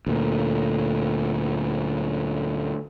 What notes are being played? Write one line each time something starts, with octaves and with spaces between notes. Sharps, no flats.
D2 A#2